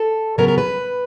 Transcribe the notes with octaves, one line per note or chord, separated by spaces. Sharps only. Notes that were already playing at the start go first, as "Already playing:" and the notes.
Already playing: A4
C#3 F#3 B3 A#4
A#4
B4